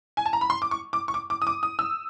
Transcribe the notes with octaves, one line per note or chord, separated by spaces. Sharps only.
G#5
A5
A#5
B5
C6
D6
C#6
D6
C#6
D6
D6
D#6
D6
D#6
E6